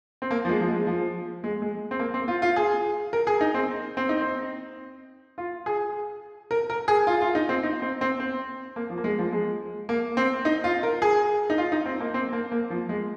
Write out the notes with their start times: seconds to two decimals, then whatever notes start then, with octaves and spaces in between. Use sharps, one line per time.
0.22 C4
0.31 A#3
0.45 F3
0.49 G#3
0.61 F3
0.68 G#3
0.87 F3
1.44 G#3
1.62 G#3
1.91 C4
1.99 A#3
2.14 C4
2.28 F4
2.42 F4
2.56 G#4
3.13 A#4
3.27 G#4
3.41 D#4
3.54 C4
3.97 C4
4.09 D#4
4.21 C4
5.38 F4
5.66 G#4
6.51 A#4
6.70 A#4
6.88 G#4
7.07 F4
7.21 F4
7.35 D#4
7.49 C4
7.63 D#4
7.82 C4
8.01 C4
8.20 C4
8.76 A#3
8.90 F3
8.98 A#3
9.04 G#3
9.19 F3
9.32 G#3
9.89 A#3
10.17 C4
10.45 D#4
10.64 F4
10.83 A#4
11.02 G#4
11.50 D#4
11.58 F4
11.72 D#4
11.86 C4
12.00 A#3
12.14 C4
12.33 A#3
12.52 A#3
12.70 F3
12.89 G#3